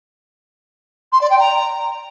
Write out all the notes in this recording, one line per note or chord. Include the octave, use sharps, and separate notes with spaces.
C6
D5
G5
A#5